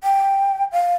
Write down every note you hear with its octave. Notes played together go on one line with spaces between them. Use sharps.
G5
F5